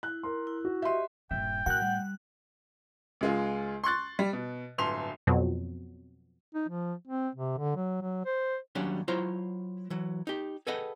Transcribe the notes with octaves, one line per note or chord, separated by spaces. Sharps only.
E4 F#6
A#4 C6
E4
F#4
G4 D#5 E5 C6
D#1 G2 A#2 E5 G5
A2 F#4 A#4 F#5 F#6
G3
C#2 G#3 F4
C6 C#6 F#6 A6
G3
B2
D1 G1 C6 F7
F2 B2 F#3
D#4
F3
C4
C3
D3
F#3
F#3
C5
D#2 F#3 G3 C#4 D4 C6
F#3 E4 F4 C5 C#5 A#5
E3 F#3
D#4 G4
G#4 A4 B4 D#5 F#5 G5